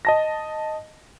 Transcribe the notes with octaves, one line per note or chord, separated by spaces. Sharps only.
D#5 A5 A#6